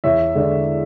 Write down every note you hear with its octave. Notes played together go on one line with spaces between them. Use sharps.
E2 C#5 E5
D3 G#3 D4